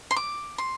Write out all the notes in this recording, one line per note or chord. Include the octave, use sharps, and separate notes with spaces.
C6
D6
C6